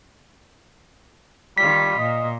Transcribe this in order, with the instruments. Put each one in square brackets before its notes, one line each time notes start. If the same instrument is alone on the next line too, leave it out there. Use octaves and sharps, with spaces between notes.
[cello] D#3 F4 [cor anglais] G3 [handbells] B6
[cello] A#2 [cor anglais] D#5